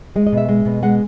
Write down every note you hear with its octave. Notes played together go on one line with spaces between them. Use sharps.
G#3 D#5
D#5
B2
E5
G#3
B2
G#3 F#5